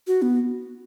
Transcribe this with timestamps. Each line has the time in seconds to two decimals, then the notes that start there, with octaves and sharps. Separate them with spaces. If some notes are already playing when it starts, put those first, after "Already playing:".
0.07 F#4
0.22 B3